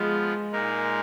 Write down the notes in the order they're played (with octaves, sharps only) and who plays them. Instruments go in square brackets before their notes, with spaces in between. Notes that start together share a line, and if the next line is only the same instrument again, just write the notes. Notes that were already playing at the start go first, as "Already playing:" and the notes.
Already playing: [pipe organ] F3 B3 F4 [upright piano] G#3
[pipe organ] A#2 G#3 D#4 A#4